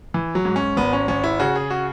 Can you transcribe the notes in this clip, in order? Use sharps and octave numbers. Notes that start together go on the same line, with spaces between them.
E3
F#3
G#2
C#4
G#1 B3
C#4
G#1 C#4
E4
C#3 F#4
G#4
F#4